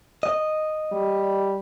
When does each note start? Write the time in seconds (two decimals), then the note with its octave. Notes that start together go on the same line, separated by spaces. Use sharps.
0.23 D#5
0.92 G3